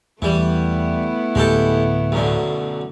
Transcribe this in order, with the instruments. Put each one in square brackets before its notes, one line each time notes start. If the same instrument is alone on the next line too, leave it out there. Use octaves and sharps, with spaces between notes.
[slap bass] E2 [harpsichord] E3 G3 [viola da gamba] A3 B3 E4
[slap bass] D1 [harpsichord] G#3 G4 A4
[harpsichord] B1 F#2 D3